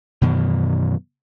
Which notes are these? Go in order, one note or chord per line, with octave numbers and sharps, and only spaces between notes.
F#2 B2 D#3 E3